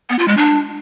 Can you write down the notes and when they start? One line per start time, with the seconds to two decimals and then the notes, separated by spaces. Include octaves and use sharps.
0.10 B3
0.19 F4
0.28 G#3
0.37 D4